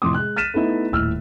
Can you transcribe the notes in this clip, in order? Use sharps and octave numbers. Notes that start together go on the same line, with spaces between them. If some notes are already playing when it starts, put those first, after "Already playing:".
F2 A2 C3 C6 D6 D#6
G#3 F#6
F6 A6 B6 D#7 E7
A3 B3 D#4 E4
D#1 A2 E6 F6